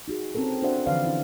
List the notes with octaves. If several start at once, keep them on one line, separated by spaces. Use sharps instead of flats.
D#4 F#4 G#4
C4 C#4 A4 A#4
D4 F#4 C5 D5 E5 F#5
D3 E3 F3 B4 D5 F5
C#4 E4